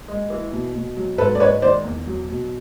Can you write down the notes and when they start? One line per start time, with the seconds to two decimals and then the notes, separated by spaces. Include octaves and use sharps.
0.08 G#3
0.30 E3
0.52 B2
0.75 B2
0.97 F#3
1.18 G#2 A4 B4
1.35 D5
1.40 G#3 B4 C#5
1.62 D#3 C5 D5
1.84 E2
2.06 F#3
2.29 B2